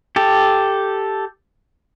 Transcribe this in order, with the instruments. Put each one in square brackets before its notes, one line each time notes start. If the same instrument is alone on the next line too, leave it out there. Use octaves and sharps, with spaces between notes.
[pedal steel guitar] G4 A4